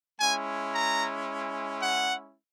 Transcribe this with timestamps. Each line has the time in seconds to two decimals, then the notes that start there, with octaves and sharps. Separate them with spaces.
0.19 G#3 C#4 E4 G#5
0.74 A#5
1.82 F#5